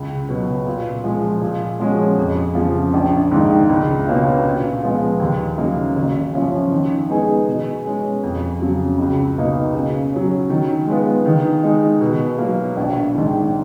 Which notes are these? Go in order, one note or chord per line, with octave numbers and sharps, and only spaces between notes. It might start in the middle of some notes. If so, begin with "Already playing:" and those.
Already playing: C#2
B2 F#3
A#2
F3 G#3
A#2
F3 G#3 C#4 F#4
F2
C#3 F3
A#1
G#2 D#3 A#3 D#4
C#2
B2 A#3 C#4 F4
A#2
F3 G#3 B3 F4
D#2
C#3 F#3 A#3 D#4
G#1
F#2 F3 A#3 C#4
D#3
G#3 B3 D#4 G#4
B2
G#3 C#4 G#4
F2
C#3 F#3
C#2
B2 A#3 D#4
C#3
F#3 C#4
D#3
G#3 B3 F4
D#3
G#3 D#4
B2
F#3 A#3
A#1
G#2 D#3